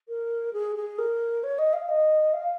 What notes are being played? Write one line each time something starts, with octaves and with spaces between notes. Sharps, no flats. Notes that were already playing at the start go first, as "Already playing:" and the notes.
A#4
G#4
G#4
A#4
C#5
D#5
F5
D#5
F5